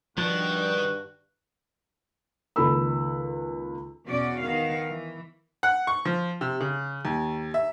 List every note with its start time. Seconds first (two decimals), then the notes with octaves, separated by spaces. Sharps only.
0.18 G2 D#3 F3 F#4
2.56 C#2 D#3 A#3 A4 B5 E6
4.07 E2 B2 C#4 F#4 D5
4.42 D#3 B3 F5
4.90 E3
5.63 F#5
5.87 C#6
6.05 F3
6.41 C3
6.61 C#3
7.05 D#2
7.54 E5